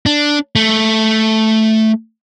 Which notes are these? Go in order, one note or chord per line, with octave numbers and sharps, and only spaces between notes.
D4
A3